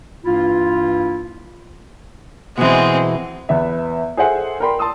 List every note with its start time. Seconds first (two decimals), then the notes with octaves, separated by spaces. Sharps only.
0.25 G2 E3 A#3 E4 F4
2.57 B2 E3 G#3 C4
3.49 E2 B3 E5
4.17 G#4 A4 C5 E5 F#5 G#5
4.60 A#4 D5 G5 B5 C6
4.79 A5 C6 D#6 E6